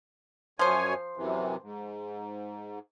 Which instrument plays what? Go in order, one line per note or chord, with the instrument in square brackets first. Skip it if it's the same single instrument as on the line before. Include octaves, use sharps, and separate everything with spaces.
[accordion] F#2 C#5 G#5 [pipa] F3 C5
[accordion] F#2 C3 E3
G#2